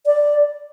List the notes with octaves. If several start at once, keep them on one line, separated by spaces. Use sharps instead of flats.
D5